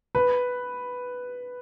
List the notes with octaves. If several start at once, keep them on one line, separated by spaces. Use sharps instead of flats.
B4